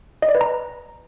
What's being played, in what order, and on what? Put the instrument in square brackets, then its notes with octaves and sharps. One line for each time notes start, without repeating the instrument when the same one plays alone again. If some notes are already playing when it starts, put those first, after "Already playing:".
[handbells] D#5
D5
B4
A#5